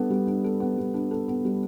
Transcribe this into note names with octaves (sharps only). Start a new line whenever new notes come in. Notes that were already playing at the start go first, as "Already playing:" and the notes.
Already playing: G3 B3 D4 A4
G3
D4
A4
B3
G3
D4
A4
B3
G3